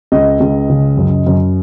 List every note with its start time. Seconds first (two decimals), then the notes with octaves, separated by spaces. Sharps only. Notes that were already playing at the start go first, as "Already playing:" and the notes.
0.12 C#2 D#5
0.40 C#2
0.69 C#3
0.97 F#2
1.26 F#2